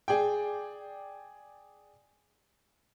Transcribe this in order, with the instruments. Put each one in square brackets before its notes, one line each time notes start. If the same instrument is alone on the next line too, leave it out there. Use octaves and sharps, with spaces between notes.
[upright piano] G#4 D5 G5